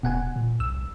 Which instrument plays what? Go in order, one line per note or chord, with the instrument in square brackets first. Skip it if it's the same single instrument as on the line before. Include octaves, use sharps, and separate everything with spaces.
[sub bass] D#1 [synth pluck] B2 F#5 G#5
[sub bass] A#2
[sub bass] C2 [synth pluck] E6